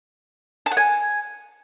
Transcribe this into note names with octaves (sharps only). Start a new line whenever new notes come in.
A5
F#5
G#5